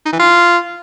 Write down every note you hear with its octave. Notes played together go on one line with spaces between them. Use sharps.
D#4
E3
F4